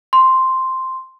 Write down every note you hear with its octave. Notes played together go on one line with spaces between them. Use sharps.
C6